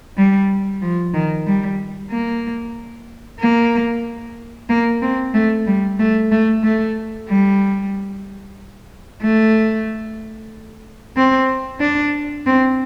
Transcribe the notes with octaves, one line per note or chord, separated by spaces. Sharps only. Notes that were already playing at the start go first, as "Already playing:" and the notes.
G3
F3
D#3
G3
A#3
A#3
A#3
C4
A3
G3
A3
A3
A3
G3
A3
C4
D4
C4